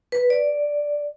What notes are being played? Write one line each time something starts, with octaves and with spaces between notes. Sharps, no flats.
B4
D5